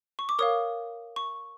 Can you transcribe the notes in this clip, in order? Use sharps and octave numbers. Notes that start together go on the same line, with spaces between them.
C#6
D6
A#4 C#5 F5 D#6
C#6